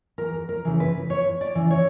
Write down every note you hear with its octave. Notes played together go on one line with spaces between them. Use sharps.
E2 A#4
A#4
C#3 E3
B4
E2 C#5
D5
C#3 E3
C#5